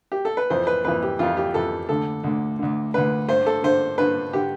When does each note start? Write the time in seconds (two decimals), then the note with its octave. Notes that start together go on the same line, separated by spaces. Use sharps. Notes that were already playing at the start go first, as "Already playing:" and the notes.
0.12 G4
0.25 A4
0.37 B4
0.50 F2 E3 C5
0.67 B4
0.85 F2 E3 B4
1.03 G4
1.19 F2 E3 F4
1.37 G4
1.54 F2 E3 A4
1.89 D2 D3 A4
2.24 D2 D3
2.59 D2 D3
2.94 D2 D3 B4
3.29 G2 D3 C5
3.46 A4
3.63 G2 D3 C5
3.98 G2 D3 B4
4.33 D3 G4